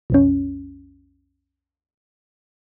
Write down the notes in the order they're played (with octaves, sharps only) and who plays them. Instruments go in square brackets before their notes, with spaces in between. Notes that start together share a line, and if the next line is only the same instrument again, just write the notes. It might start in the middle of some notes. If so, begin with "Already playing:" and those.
[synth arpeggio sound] B1 F2 C#4